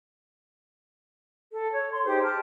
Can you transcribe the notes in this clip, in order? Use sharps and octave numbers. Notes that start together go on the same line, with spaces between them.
A4
C#5
C6
D#4 G4 G#4 C5
A5 F6